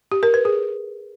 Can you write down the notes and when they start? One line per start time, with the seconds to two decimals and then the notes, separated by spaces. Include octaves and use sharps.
0.12 G4
0.23 A#4
0.34 B4
0.45 G#4